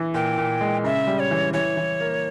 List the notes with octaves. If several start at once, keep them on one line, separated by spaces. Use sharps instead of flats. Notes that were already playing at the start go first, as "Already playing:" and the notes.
Already playing: E3
A#2 G5
A#2
G#3
C#3 E5
G3
C#5
E3
E3 C#5
E3
A#3